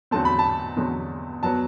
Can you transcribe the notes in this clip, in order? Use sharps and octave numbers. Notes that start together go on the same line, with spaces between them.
E2 D3 F#3 A3 C4 A5
B5
A5
E2 D3 F#3 A3 C4
F#2 F#3 B3 A5